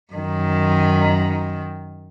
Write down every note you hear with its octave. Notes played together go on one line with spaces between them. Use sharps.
F#2 D#3